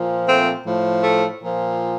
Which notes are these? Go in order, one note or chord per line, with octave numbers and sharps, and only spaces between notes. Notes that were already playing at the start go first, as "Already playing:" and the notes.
Already playing: A#2 F3
A3 C4
A2 F3
A3
A#2 F3